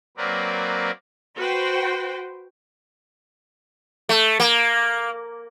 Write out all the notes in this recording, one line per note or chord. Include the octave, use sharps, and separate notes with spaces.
F#3 A#3 C4 A#4 B4 D5
F#4 B4 C5 G5
A3
A#3